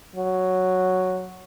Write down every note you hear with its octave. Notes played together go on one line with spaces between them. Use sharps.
F#3